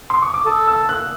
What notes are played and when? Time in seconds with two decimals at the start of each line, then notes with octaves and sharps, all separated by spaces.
0.10 C6
0.22 C#6
0.34 D6
0.45 A4 D#6
0.67 E6
0.89 F#6